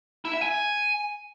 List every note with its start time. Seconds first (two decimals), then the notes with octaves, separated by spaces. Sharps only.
0.25 E4
0.34 E5
0.42 G#5